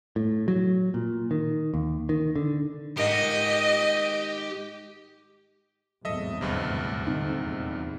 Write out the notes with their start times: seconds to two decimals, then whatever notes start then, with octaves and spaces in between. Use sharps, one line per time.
0.16 A2
0.48 F#3
0.94 A#2
1.31 D#3
1.74 D#2
2.09 D#3
2.36 D3
2.97 G#2 D#3 A#3 G4 D#5 F#5
6.05 G#1 E2 A2 F#3 A4 D#5 E5
6.41 D#1 D2 G2 C3
7.07 D3 C4 D#4
7.42 E2 A#2